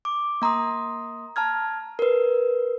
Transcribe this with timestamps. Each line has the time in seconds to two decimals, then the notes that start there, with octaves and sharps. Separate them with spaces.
0.05 D6
0.42 A#3 A#5 C6 D#6
1.36 A5 A#5 F6 G#6
1.99 A#4 B4